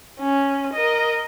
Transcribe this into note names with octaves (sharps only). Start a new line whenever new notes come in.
C#4
A#4 D#5